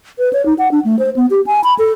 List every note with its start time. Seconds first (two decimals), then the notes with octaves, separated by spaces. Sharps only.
0.19 B4
0.33 C#5
0.46 D#4
0.59 F#5
0.72 D4
0.85 A3
0.99 C5
1.16 B3
1.30 G4
1.47 G#5
1.64 B5
1.79 A4